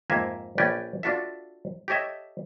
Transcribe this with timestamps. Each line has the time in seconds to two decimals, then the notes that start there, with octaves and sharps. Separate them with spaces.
0.10 F2 G#2 A#3 E5 G#5
0.58 A#1 C#4 B4 D5 G5 G#5
1.03 D4 F4 F#4 A4 E5
1.88 G4 A4 C#5 D#5 E5